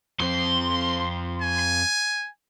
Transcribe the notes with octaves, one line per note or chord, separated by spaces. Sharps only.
F2 C4 C6
G#5